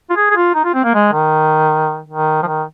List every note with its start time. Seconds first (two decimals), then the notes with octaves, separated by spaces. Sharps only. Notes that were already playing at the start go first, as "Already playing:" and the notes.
0.10 F4
0.16 G#4
0.30 G#4
0.36 F4
0.55 D#4
0.65 F4
0.74 C4
0.84 A#3
0.94 G#3
1.13 D#3
2.09 D#3
2.43 F3
2.47 D#3